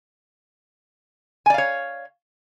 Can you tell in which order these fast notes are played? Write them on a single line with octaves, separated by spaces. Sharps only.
G#5 D5 F5 C#5